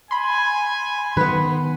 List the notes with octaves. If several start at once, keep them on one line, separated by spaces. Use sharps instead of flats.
G#5 B5 C6
D#3 B3 B4